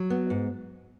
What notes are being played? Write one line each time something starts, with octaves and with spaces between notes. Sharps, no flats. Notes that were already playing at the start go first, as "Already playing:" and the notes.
Already playing: F#3
B3
G#2